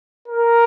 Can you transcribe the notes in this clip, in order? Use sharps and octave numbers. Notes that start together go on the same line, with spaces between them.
A#4